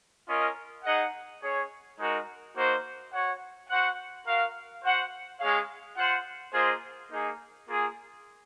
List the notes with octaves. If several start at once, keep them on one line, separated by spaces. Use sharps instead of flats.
C#4 F4 A#4 D#5
D#4 G#4 D#5 F#5
C#4 G#4 C#5
G#3 D#4 F#4 A#4
A#3 D#4 F#4 C5
F#4 C#5 F#5
F#4 C5 F#5
F#4 A#4 F5
F#4 C5 F#5
G#3 C#4 G#4 C#5 F5
F4 C5 F#5
A#3 F4 G#4 C5 D#5
A#3 D#4 G#4
A#3 F4 G#4